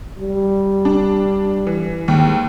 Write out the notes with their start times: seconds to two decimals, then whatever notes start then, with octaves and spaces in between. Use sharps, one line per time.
0.19 G3
0.85 D4
1.67 E3
2.08 D#2 G#2